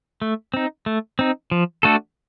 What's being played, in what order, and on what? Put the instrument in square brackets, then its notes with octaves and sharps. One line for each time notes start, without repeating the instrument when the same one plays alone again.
[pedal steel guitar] A3
C4 D#4
A3
C4 D#4
F3
A3 D4 F#4 A4